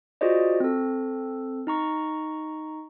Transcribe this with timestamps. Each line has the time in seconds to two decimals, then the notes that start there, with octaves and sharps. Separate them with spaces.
0.21 F4 F#4 G#4 C5 D5 D#5
0.60 C4 A4
1.67 D#4 A#5 C#6